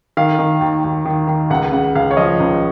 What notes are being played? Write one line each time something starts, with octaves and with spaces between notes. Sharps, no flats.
D#3 F5
D#3
D#2
D#2
D#3
D#3
C#2 F#5
C#3 F#5
C#2 F5
C#5
F3 D#5
C#2